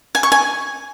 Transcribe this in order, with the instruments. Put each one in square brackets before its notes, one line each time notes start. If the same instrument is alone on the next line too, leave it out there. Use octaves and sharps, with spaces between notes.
[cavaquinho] G#5
C#6
G#5